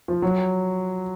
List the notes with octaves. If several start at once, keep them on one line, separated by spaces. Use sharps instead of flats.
F3
F#3